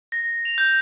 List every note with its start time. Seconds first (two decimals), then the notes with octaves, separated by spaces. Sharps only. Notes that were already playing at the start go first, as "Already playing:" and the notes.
0.12 A#6
0.45 F7
0.58 G6